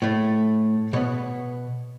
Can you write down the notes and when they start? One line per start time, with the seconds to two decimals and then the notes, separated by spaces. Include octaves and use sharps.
0.02 A2 A3
0.93 B2 B3 C#5